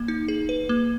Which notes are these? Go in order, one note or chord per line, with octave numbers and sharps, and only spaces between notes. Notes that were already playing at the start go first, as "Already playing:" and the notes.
Already playing: A#3
D#4
G#4
B4
A#3